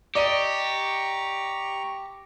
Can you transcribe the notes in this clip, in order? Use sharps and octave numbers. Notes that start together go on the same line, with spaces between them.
G4 D5 D#5 A#5 C#6 D#7